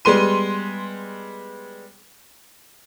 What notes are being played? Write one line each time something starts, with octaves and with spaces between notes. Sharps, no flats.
G3 G#3 B3 C6 D#7